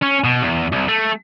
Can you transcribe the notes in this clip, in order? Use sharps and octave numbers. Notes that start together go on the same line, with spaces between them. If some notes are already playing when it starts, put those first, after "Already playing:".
C#4
B2
E2
C2
A3